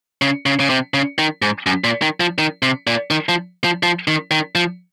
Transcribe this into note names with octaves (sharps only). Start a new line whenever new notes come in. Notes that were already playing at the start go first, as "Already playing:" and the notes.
C#3
C#3
C#3
C3
C#3
D#3
G#2
F#2
A#2
D#3
F3
D#3
C3
A#2
D#3
F3
F3
F3
D#3
D#3
F3